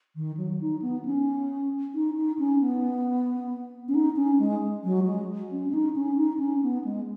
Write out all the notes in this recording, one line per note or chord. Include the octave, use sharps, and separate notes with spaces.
D#3
F#3
D#4
B3
C#4
D#4
D#4
C#4
B3
C#4
D#4
C#4
G#3
F#3
G#3
C#4
C#4
D#4
C#4
D#4
C#4
B3
G#3